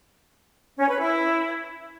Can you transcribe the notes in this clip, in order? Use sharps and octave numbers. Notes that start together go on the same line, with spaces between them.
C#4
B4
E4